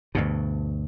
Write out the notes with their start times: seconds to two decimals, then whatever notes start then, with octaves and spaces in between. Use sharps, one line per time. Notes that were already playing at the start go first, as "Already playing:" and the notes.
0.15 D2 G2 B2